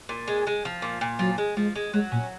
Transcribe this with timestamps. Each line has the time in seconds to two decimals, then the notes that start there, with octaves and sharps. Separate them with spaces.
0.09 A#2
0.27 G#3
0.47 G#3
0.65 F3
0.82 A#2
1.01 A#2
1.19 F3 F#3
1.38 G#3
1.57 F3 G#3
1.75 G#3
1.93 F#3 G#3
2.12 A#2 C#4